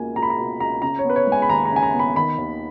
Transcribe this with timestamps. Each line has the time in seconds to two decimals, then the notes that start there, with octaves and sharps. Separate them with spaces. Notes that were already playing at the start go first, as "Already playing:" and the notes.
Already playing: C#2 B2 A#3 G#5
0.15 C#2 A#5
0.23 B5
0.30 A#5
0.38 B2
0.60 C#2 A#5
0.82 C#3 A#5
0.99 C#5
1.05 B3 B4
1.16 C#5
1.27 G#3
1.32 G#5
1.42 B5
1.49 D#2 A#5
1.65 A#5
1.71 C#3 G#5
1.83 A#5
1.93 B3
1.99 B5
2.16 D#3 B5
2.38 D#2